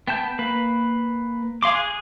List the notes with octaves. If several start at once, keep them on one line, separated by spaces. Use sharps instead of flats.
B3 G5 A5 G6
A#3 B4
G#4 F5 C6 D6
G#4 F#6